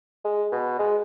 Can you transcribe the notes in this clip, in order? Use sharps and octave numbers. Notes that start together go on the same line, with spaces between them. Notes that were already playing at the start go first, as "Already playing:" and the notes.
G#3
B2
G#3